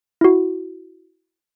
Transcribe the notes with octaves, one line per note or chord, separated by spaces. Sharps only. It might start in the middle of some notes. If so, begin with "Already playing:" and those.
E4 F#4